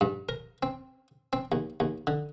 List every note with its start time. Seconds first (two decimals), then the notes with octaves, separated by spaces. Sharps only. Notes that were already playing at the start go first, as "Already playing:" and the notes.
0.01 G2
0.29 A#4
0.63 C4
1.33 C4
1.52 D#2
1.80 D#2
2.07 D3